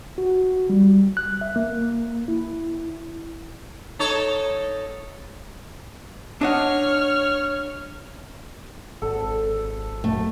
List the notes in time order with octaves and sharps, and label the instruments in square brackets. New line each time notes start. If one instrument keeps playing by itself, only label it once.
[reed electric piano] F#4
G3
F#6
E5
A#3
E4
[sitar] D#4 A4 C#5
[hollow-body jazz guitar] D4 D#5 F#5 [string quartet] C#5 F6
[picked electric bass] G#1 [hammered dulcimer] A4
[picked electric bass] F#2 A#2 [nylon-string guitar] A3